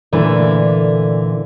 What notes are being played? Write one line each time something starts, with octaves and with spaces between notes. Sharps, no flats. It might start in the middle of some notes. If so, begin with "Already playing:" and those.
A#2 D3 E3 A3